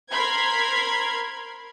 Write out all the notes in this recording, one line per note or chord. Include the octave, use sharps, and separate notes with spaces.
A#4 C5 B5 C6 F6 G#6